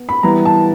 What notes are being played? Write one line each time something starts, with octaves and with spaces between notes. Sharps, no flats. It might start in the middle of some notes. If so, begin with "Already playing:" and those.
Already playing: B3
B5
E3 G3 B3 E4 A#5
A5